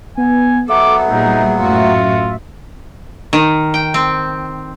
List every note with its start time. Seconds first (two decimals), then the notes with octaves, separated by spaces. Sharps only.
0.17 B3 G#5
0.69 F#3 B3 A4 E5 D6
1.10 A#2 G3 D#4 G#4
1.58 F#2 A2 F4 F#4
3.33 D#3
3.74 G5
3.94 C4